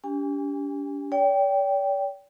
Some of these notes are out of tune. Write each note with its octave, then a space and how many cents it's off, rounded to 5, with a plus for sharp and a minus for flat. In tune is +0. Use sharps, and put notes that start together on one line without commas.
D4 -45 G4 +0 G#5 -40
D5 -45 G5 +0